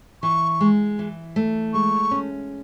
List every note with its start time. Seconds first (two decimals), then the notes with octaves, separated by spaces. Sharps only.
0.23 E3 C#6
0.61 G#3
0.99 E3
1.36 A3
1.74 G#3 C#6
2.11 C#4